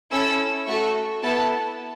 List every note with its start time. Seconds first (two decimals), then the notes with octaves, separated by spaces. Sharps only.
0.11 C#4 E4 A4 E6
0.67 A3 F#4 A4 C#6
1.23 B3 E4 A4 A5